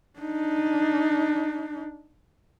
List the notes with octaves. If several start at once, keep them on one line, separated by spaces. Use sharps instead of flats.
D4 D#4